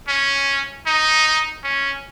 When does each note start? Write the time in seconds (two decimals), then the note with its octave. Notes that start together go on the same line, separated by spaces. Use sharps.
0.09 C#4
0.87 D#4
1.64 C#4